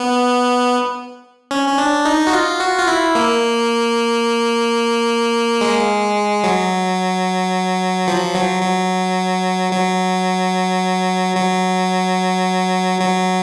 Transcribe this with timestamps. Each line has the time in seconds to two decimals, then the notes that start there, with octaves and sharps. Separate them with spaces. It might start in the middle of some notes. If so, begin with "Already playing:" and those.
Already playing: B3
1.51 C#4
1.68 C#4
1.78 D4
2.05 D#4
2.27 F#4
2.33 F4
2.60 F#4
2.78 F4
2.88 E4
3.15 A#3
5.61 G#3
6.43 F#3
8.08 F3
8.35 F#3
8.63 F#3
9.72 F#3
11.37 F#3
13.00 F#3